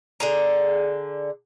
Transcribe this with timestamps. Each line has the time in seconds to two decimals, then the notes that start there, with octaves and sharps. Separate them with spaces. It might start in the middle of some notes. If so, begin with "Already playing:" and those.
0.20 D3 G#4 A#5